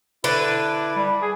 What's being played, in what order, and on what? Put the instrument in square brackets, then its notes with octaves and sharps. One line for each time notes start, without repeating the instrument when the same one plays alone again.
[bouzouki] D3 D4 B4 [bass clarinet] E4
[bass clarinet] G3
G#4